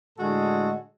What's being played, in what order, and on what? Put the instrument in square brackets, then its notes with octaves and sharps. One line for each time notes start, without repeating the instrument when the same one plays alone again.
[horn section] A2 D3 G#3 F#4 G#4 A4